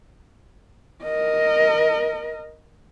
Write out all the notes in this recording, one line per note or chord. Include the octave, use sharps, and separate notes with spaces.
A#4 D#5